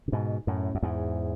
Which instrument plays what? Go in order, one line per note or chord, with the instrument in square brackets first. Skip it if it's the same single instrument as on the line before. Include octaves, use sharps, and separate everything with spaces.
[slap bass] C#3
G#2 B2
F#2 A2
F#2
E2 G#2